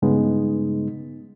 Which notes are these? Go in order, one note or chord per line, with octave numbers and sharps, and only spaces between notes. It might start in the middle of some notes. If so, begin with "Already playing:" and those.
G2 C#3 G#3 B3 D#4